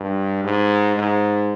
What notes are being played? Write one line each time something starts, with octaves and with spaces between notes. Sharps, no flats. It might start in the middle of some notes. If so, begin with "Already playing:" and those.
Already playing: G2
G#2
G#2